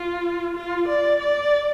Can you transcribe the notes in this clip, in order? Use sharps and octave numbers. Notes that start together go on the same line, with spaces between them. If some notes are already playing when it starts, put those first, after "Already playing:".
Already playing: F4
F4
D5
D5